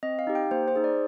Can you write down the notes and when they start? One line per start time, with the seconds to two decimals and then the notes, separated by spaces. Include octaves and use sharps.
0.03 C4 D#5
0.19 F5
0.27 D#4 G4
0.35 G5
0.51 A#3 C5
0.68 C5
0.75 D#4 G#4
0.84 D5